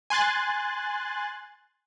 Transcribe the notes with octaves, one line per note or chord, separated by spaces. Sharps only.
G#5 C6 F#6 A6